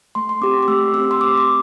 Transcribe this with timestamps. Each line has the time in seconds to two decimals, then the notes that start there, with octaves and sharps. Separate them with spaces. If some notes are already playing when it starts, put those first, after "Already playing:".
0.15 A3 C6
0.29 C6
0.41 C4 G4 D6
0.63 D6
0.68 A3 E6
0.93 C4 E6
0.98 G4
1.11 C6
1.21 C4 D6
1.37 D6